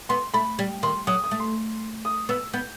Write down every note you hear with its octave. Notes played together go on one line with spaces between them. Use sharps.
B3 C6
A3 B5
G3
D#3 C6
F#3 D#6
D#6
A3
C6
D#6
B3 E6
B3 G6